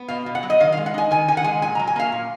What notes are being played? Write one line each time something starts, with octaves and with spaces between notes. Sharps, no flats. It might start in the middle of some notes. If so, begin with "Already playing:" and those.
Already playing: B3
B2 F5
B2
F#5
F#3
D#5
D#3 F5
F5
G#3
F#5
D#4 G#5
D#3 G#5
D#3 G#5
F#5
G#3 G#5
A#2 G#5
A#5
F#3
G#5
A#3 F5
A#2